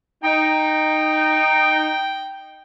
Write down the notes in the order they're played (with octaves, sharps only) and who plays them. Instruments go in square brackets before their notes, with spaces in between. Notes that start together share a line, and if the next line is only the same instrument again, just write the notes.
[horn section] D#4 [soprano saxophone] G5